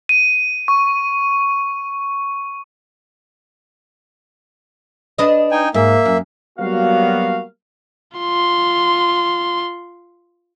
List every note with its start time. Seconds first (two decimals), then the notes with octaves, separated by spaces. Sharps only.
0.09 D#7
0.68 C#6
5.18 D4 B4 D#5
5.51 D#4 G5 G#5
5.74 G#2 A#3 E5
6.05 F#2
6.59 F#3 G3 A#3 B3 F#4 F5
8.17 F4 C6